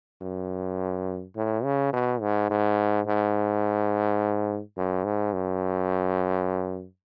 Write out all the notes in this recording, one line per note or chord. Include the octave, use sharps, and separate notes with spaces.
F#2
A2
C#3
B2
G#2
G#2
G#2
F#2
G#2
F#2